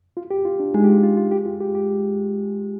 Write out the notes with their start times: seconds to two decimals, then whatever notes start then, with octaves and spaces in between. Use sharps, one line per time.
0.17 F4
0.31 G4
0.45 F4
0.60 D4
0.74 G#3 D#4
0.84 G4
0.89 F4
1.03 F4
1.17 F4
1.31 G4
1.46 F4
1.60 G4
1.75 G4